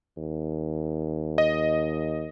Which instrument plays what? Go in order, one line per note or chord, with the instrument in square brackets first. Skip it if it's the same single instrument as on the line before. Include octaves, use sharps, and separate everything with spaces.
[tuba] D#2
[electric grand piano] D#5